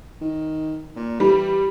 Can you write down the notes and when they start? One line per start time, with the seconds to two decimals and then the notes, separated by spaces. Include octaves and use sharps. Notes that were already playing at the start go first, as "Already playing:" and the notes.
0.21 D#3
0.96 A#2
1.20 E3 G3